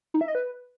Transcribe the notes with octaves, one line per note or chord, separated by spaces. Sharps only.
D#4
E5
D#5
B4